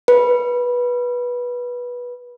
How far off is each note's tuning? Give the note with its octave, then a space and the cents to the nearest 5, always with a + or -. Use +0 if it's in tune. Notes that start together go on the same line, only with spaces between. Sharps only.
B4 -15